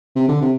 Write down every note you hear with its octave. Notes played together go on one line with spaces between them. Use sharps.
C3
D3
C3